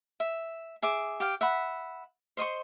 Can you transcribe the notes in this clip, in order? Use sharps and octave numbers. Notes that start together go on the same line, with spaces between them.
E5
G#4 E5 D6
G4 F5 G5
E5 F#5 B5
C5 D#5 C6 C#6